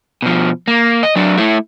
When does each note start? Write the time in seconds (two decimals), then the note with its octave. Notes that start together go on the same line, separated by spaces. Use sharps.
0.22 B2 F3
0.68 A#3
1.03 D#5
1.16 F#3 D4
1.38 A3 E4